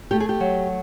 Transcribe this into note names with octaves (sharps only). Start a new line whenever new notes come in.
A3 G4
G#4
G4
F#3